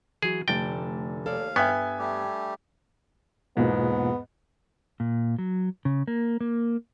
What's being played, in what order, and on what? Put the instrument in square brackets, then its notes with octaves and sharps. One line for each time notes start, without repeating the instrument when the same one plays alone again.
[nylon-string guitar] E3 F#3 F#4 [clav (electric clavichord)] G#4
[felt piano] F1 A6 [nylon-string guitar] D3 A3 [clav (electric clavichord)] G5
[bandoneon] D#2 F5 [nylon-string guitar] A4 C#5 D5
[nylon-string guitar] G2 [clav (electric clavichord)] B3 [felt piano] E5 G5 G#5
[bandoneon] G3 A3 G4
[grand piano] E2 G#2 [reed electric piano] B2 A#3 F4 [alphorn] B3
[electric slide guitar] A#2
F#3
C#3
A#3
A#3